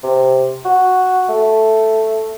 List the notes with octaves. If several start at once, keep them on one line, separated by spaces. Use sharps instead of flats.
C3
F#4
A3